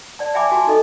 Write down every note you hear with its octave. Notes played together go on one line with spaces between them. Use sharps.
D5 A5
D5 E5 G5 G#5 B5 D6
F#4 G#5 A5
D#4 A4 D#5